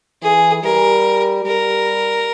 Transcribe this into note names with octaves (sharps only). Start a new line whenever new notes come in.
E3 G#4
G3 A#4
G3 A#4